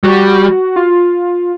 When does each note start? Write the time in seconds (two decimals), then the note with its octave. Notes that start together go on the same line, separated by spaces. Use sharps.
0.04 G3 F#4
0.76 F4